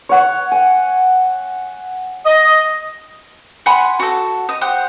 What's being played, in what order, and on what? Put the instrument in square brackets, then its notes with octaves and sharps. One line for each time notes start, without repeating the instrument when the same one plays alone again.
[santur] C#5 F#5
G#5
[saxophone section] D#5
[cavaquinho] F#5 G#5 B5 C6
F#4 A4
D#5
G4 C5 F#5